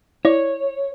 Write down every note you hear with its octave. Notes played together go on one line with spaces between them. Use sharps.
E4 C#5 D5